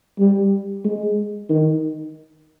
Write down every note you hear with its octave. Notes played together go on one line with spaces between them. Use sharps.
G3
G#3
D#3